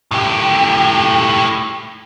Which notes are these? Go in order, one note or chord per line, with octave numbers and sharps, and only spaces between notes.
A2 G4